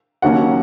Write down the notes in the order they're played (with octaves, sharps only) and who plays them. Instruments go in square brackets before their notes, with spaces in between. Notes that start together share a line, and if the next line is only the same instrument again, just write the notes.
[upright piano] D#2 D#3 F#3 A#3 C#4 F#5